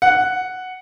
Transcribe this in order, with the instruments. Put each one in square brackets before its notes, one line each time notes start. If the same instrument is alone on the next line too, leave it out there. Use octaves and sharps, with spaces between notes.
[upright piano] F#5